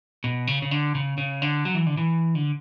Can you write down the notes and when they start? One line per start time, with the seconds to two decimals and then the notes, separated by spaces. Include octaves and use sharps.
0.24 B2
0.47 C#3
0.62 C#3
0.71 D3
0.95 C#3
1.18 C#3
1.42 D3
1.65 F#3
1.75 E3
1.87 D3
1.97 E3
2.35 D3